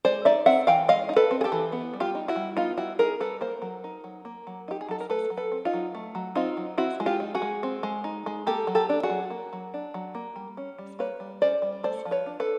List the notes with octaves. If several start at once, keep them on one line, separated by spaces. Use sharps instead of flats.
G#3 C5 D5
D#4 D5 E5
C4 E5 F#5
E3 F5 G5
G#3 D#5 F5
D#4
A4 B4
C4
G#4
G4 A4
E3
B3
G3
F4 G4
D#4
E4 F#4
G3
B3 D#4 F4
G3 E4 F#4
D#4 G#4 A#4
G3 A4 B4
A#3 A#4 C5
F#3
D#4
F#3
A#3
F#3
D#4 G4
G#4
F#3 A4
A#4
A3 A4 B4
F#3
A4 B4
C4
D#4 F4
F#3
A3
F#3
C4 D#4 F4
F#3
C4 E4 F#4
G#3
F4 G4
D#4
F#4 G#4
G#3
C4
G#3
D#4
G#3
A#3 G4 A4
F#3
G4 A4
D4
F#4 G#4
F#3
A#3
F#3
D4
F#3
A#3
G3
C#4
G3
A#3 B4 C#5
G3
C#4 C5 D5
G3
A3 C5 D5
F3
B4 C#5
D4
A4 B4